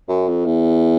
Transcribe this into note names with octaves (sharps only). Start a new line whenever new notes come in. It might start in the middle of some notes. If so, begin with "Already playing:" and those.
F#2
F2
E2